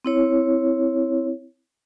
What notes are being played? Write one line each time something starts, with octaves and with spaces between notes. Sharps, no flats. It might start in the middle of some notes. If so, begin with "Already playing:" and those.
C4 E4 C#5